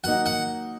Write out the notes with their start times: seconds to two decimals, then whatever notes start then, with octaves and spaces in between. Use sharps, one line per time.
0.04 F#3 A#3 D#4 F#5
0.26 F#5